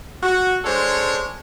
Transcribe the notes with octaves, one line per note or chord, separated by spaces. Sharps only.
F#4
G#3 D4 A4 C5 C#5